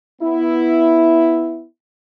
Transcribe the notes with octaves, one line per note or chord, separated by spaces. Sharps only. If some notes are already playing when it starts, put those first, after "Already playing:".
B3 E4